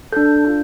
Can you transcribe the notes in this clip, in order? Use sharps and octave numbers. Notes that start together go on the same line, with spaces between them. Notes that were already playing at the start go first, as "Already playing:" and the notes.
D4 A4 G6
D4 F4